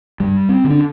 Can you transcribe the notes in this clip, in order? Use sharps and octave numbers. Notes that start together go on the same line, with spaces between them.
G2 G3
C4
D3
D4